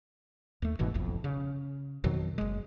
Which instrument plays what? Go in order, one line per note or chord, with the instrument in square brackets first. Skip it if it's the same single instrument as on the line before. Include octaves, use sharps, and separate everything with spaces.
[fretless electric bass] D#2 A3
G1 G#2 B2 E3
F#1 B1 F2
C#3
F2 B2 D#3 F#3
F#1 G#3